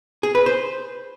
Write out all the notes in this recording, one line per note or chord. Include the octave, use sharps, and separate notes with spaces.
G#4
B4
C5